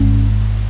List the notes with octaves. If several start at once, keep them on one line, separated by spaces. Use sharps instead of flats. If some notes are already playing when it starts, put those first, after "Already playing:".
Already playing: G#1 G#2 C#4